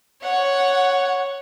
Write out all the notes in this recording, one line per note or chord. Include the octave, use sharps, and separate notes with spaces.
C#5 F#5